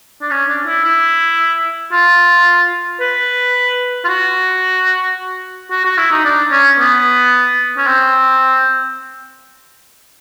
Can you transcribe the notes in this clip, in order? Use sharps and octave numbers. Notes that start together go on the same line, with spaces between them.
D4
C#4
D4
E4
E4
F4
B4
F4
F#4
F#4
F#4
E4
D#4
D4
C#4
B3
C#4
C4